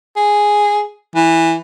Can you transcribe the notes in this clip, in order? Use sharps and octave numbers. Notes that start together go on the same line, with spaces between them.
G#4
E3